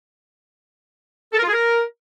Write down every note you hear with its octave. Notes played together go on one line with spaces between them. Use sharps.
A4
A#4
F4
G#4
A#4